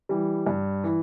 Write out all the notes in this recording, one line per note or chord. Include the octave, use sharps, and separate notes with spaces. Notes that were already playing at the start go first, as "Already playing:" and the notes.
E3 G3
G2
E3